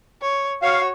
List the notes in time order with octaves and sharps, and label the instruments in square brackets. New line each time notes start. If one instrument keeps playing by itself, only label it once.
[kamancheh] C#5
[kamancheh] F#4 C#5 [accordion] F5